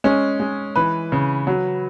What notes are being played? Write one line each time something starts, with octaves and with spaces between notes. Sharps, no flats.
G#3 C#4
G#3
E3 B4
C#3
F#3